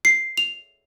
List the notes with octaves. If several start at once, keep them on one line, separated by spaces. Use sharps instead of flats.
C7
F7